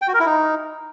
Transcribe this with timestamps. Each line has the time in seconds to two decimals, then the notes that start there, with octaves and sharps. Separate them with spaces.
0.02 G5
0.08 F#4
0.14 A#4
0.20 E4
0.26 D#4